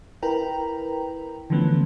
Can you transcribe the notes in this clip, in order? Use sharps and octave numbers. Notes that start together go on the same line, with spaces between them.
E4 A#4 B4 G5 A#5
D3 E3 F3 A3 B3 C#4